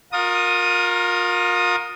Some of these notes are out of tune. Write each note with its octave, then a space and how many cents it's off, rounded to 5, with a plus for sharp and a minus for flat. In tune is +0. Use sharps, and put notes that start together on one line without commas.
F4 +35 A#4 +0 D#6 +0